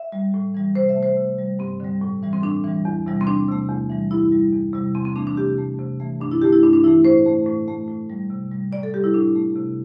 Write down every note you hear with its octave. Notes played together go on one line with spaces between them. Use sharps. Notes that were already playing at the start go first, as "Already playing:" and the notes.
Already playing: E5
G3
A2
E3 G3
C3 C5
E5
A3
C5
C3
G3
G2 C4
D3 G3
A2
E3 G3
C4
A2 D4
E3 G3
E2
C3 E3 G3
C4
E2 D4
C3 A3
E2
E3 G3
G2 E4
G3
E2
C3 G3
E2 C4
C4
E3 A3 D4
D4
C3 G4
A3
C3
E3 A3
G2 D4
E4
D3 A3 G4
E4
G2 D4
D4
E3 A3 E4
A2 C5
A3
A2
A3
A2
G3
C3
G3
A2 D5
A4
G3 G4
E4
A2 D4
A3
C3